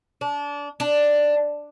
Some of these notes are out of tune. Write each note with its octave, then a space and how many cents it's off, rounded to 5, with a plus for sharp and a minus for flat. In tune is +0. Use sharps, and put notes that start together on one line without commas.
D4 -25
D4 +5